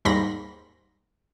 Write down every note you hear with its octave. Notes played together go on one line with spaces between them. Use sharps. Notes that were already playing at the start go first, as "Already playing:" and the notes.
D#2 G#2 G3 B5 C6 A#6